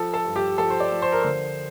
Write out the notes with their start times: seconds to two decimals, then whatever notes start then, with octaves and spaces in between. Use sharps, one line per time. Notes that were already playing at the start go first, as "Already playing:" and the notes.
Already playing: F3 A4
0.14 A4
0.25 G2
0.36 G4
0.58 F3 A4
0.70 C5
0.80 D5
0.91 F3
1.02 C5
1.12 A#4
1.22 D3 C5